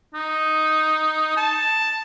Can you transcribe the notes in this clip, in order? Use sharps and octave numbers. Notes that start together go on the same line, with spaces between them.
D#4
A5